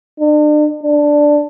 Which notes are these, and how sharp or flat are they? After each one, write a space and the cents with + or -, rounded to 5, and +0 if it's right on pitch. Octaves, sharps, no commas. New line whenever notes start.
D4 +40
D4 +0